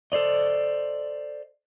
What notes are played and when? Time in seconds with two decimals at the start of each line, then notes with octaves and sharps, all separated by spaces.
0.12 A4 C5 D5 D#5